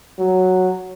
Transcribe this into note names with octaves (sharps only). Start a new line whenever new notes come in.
F#3